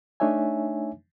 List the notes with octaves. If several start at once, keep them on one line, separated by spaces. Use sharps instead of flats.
A3 D4 D#4 C#5 E5 G#5